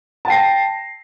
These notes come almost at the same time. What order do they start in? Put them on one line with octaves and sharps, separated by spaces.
A5 G5 C7 A#6